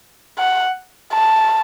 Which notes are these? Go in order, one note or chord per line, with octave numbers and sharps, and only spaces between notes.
F#5
A5